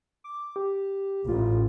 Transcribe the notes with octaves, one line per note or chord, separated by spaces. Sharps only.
D6
G4
A1 F4